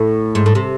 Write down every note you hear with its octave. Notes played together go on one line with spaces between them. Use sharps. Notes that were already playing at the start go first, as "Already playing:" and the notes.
Already playing: A2
G#2
A2
C3